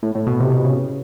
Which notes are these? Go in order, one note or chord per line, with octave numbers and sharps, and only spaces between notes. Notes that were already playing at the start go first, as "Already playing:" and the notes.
A2
A2
B2
C3
B2
C#3